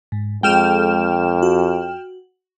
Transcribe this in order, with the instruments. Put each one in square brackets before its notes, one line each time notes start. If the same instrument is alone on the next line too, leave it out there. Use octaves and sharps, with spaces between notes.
[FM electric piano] G#2
[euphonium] F2 [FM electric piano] G#3 G#4 A4 [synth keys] G5 F6 E7
[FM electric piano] F#4